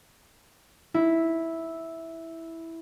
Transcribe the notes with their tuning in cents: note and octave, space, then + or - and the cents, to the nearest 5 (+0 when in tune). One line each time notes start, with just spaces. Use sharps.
E4 -5